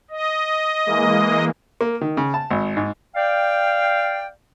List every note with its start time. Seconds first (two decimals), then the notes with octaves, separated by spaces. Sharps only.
0.10 D#5
0.86 E3 G#3 A#3
1.81 A#3
2.01 D#3
2.17 C#3
2.34 A5
2.50 G#1
2.77 G#2
3.16 D5 F5 G5